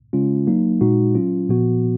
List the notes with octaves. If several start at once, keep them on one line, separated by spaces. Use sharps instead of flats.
C#3 G#3 C#4 F4
F#3 A#3 D#4
A#2 G#3 D#4 F#4
F#3 C#4 F4
A#2 F3 B3 F#4